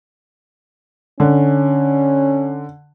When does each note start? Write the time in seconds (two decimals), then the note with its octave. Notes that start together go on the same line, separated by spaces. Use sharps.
1.20 D3 C#4